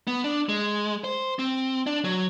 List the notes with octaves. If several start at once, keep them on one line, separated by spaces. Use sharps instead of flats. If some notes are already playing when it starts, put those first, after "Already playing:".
B3
D4
G#3
C5
C4
D4
F#3